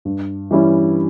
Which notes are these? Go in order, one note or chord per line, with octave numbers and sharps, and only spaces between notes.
G2
E3 G3 C#4 E4